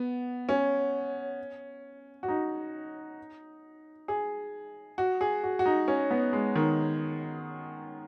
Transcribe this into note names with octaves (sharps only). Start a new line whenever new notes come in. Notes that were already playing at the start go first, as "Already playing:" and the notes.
Already playing: B3
C#4
F#4
D#4
G#4
F#4
G#4
F#4
F#4
D#4
C#4
B3
G#3
D#3